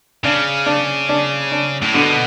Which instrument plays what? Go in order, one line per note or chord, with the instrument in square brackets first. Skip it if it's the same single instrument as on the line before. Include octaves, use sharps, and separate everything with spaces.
[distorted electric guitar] C#3 [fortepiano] D4
[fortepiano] D4
D4
D4
[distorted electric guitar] A2
[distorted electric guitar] B2 [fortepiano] D3